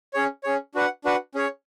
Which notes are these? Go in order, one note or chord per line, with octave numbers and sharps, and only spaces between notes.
C#4 G#4 C#5
C#4 G#4 C#5
D4 F#4 B4 F#5
D4 F#4 B4 F#5
C#4 G#4 C#5